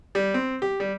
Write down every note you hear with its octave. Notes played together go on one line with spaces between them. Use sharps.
G3
C4
G4
G3